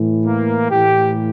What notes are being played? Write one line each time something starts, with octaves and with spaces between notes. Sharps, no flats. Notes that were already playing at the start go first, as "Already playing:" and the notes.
Already playing: A2 E3
A#3
A2 E3 G4